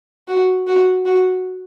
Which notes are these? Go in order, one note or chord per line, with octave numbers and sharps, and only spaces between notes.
F#4
F#4
F#4